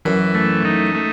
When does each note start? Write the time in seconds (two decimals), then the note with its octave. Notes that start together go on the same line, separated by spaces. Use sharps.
0.05 F#2 E3
0.35 A3
0.65 D#4
0.95 A3